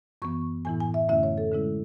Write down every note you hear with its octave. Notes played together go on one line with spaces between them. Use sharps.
F#2 E3 B3 C#6
A2 E3 B3 E4 G#5
G#5
E5
F#2 D3 A3 C#4 E4 E5
C#5
A4
D3 G#3 C#4 E4